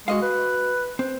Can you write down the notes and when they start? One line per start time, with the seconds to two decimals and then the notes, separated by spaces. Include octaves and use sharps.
0.08 G#3 F#4 D#5 F5
0.22 B4
0.99 C4